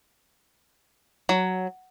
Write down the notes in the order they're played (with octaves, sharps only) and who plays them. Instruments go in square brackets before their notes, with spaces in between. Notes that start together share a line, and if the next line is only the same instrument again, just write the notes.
[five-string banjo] F#3